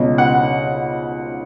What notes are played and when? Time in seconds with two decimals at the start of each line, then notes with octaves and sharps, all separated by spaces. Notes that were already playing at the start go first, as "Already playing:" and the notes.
Already playing: C#2 B2
0.18 F#5